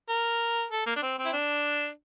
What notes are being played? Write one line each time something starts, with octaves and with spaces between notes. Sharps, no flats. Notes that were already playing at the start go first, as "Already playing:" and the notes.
A#4
A4
A#3
D4
C4
C4
E4
D4